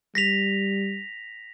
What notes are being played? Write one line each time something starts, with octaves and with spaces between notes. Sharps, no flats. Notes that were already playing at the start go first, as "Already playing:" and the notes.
G3 A#6 B6 F7